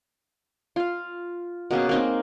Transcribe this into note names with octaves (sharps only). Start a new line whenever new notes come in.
F4 F5
B2 A#3 C#4 G#4
A#3 C4 D#4